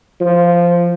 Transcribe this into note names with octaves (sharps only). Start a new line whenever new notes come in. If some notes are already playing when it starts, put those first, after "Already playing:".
F3